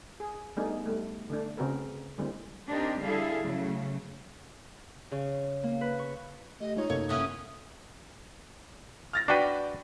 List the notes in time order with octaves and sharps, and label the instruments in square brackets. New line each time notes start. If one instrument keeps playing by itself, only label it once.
[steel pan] G#4
G3 A3 B3 D4 D#4 G#4
G3 A3
D3 A3 D4
C#3 C4 F#4 G#4 A#4 B4
D3 G3 G#3 A#3 C4 E4
[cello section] C4 D4 D#4 G4 A#4
D3 G3 E4 G#4 A4 F5
C#3 F#3 A3
[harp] C#3
A#3
B4
C#6
[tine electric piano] A3 G4 [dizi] D#5
[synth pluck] G#3 F4 C#5 [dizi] D#4
[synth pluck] F#2 [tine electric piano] C3 A#3 A4 [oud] C#5
[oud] B3 C#4 E4 [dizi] D#6
[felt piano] F6 A6 A#6
[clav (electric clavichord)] D4 F#4 B4 [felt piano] D5 G5